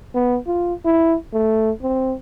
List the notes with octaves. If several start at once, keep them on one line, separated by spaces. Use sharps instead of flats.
B3
F4
E4
A3
C4